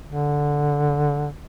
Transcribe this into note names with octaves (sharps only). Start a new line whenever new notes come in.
D3